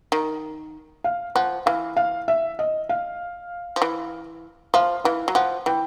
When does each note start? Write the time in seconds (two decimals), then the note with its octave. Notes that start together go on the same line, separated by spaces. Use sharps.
0.12 D#3
1.04 F5
1.35 F3 F#5
1.66 E3 F5
1.97 F5
2.28 E5
2.59 D#5
2.89 F5
3.76 F3
3.82 E3
4.74 F3 F5
5.04 E3 F5
5.28 F#3
5.35 F3 F#5
5.66 E3 G5